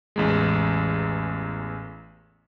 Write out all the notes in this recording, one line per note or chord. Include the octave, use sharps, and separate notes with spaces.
A1 E2 G#3